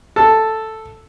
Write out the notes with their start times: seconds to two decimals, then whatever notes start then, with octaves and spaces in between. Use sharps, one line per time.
0.16 A4 A5